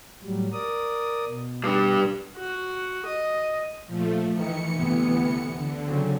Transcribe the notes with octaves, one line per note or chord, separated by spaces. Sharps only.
A2 F#3 G3
A#4 D5 D#6
B2
G2 G3
F#4
D#5
A#2 F3 A3
D#3 E3 C#7
D2 C3 B3
D3
C#3 F#3 C4